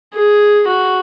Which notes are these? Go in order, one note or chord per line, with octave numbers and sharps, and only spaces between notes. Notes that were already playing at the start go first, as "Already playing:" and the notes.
G#4
F#4